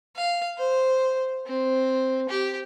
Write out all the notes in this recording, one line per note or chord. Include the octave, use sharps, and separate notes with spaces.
F5
C5
C4
G4